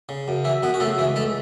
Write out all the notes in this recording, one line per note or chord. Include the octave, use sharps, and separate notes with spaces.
C#3
F#2
E3 E4
F#2 B3 B4
F#4
C#3 A3 A4
C#2 E3 E4
C#2 A3 A4